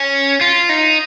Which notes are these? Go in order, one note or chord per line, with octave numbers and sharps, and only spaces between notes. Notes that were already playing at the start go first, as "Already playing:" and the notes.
Already playing: C#4
F4
D#4